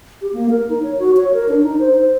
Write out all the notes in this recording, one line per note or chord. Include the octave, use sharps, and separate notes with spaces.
G4
A#3
A#4
D#4
C#5
F#4
C#5
A#4
D4
D#4
C5
C5